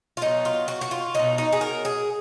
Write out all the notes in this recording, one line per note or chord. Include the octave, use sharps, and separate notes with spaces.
F4
B2 F#3 D#4
F4
F#4
F#4
F4
B2 F#3 D#4
D#4
G#4
A#4
G#4